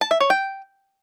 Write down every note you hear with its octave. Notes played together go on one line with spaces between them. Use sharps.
A5
E5
C#5
G5